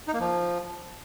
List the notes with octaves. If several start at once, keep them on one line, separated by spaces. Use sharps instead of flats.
D#4
A#3
F3